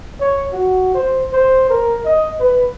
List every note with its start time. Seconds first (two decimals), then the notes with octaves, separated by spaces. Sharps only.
0.20 C#5
0.52 F#4
0.95 C5
1.33 C5
1.69 A#4
2.05 D#5
2.39 B4